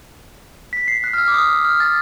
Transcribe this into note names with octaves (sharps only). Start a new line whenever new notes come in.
B6
C7
F#6
F6
E6
D6
D#6
E6
F6
A6